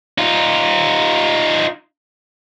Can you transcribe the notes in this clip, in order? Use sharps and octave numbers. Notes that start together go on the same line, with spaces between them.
D#4 F4